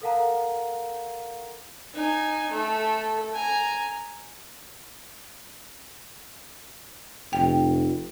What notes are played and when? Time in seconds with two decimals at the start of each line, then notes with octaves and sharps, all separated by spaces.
0.02 A4 A#4 F5 F#5 A5 A#5
1.95 D#4 G#5
2.52 A3 A4
3.34 G#5 A#5
7.33 F1 G5